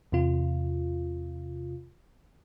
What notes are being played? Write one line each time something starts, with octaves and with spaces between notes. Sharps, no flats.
E2 C3 F4